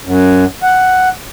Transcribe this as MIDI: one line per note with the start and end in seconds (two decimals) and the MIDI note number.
0.06 0.45 42
0.63 1.09 78